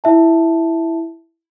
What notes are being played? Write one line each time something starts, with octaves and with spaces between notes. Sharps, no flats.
E4 E5 A5